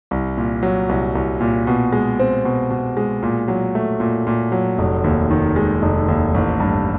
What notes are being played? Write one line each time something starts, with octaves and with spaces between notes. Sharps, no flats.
C2
A#2
F#3
C2
C2
A#2
B2
G#3
C4
B2
B2
G#3
A#2
F#3
A3
A#2
A#2
F#3
F1
D#2
D#3
G#3
F1
D#2
A1
G2